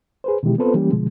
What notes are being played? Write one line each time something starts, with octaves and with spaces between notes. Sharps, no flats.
G#4 B4 C5
B2 D#3 E3 G#3 E4 G4
B3 C4 F4 A4 B4 C5
E3 G3 A#3 C#4 G4
B2 D3 F3 G#3